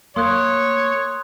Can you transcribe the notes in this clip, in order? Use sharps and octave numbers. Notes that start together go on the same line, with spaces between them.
A#3 C#5 C6 D#6 F#6